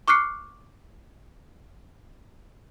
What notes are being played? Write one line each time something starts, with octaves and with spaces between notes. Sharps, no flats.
C#6 D6 F6 F#6 C7 C#7